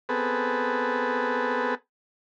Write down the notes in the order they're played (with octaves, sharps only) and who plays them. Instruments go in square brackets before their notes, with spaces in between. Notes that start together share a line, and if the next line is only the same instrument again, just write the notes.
[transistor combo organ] B3 C4 G#4 A4 B4